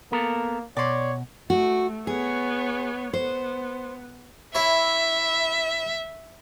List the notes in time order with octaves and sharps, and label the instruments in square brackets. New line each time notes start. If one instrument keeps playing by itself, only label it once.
[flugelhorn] A#3 [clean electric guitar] B3 A4 A#4
[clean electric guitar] B2 [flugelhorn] C#5 [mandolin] D5 C6
[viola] A3 [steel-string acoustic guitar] F#4
[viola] B3 C#5 [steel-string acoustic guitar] G#4
[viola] B3 [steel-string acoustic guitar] C5
[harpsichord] E4 C#5 [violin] E5